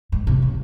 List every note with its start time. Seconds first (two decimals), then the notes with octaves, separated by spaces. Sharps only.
0.12 G#2
0.27 C3
0.42 C#3